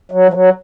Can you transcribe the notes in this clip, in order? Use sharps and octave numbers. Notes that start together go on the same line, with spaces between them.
F#3
F3
F#3